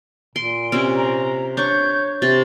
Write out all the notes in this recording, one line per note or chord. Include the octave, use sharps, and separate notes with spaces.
A#2 C6 D7
C3 C4 C#4
A#5
D4 C#5 C#6 G6
C3 A6